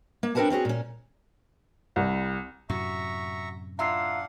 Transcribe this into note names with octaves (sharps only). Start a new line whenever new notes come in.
A#3
C4 D4 A#4 B4 F#5 A5
C4 C#4 F#4 G#4
A#2 C#4
C2
F#2 A2 C3 F#4 E5 A#5 C#6
D4 E4 F4 F5 F#5 A#5 E6 C7